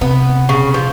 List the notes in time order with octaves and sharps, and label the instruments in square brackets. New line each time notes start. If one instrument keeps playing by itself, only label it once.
[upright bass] C3 [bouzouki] B3
[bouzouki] C#3
F3